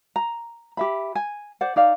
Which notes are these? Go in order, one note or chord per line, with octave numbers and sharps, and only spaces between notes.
A#5
G4 E5 B5
G#5
C5 D5 F#5
D#4 D5 F5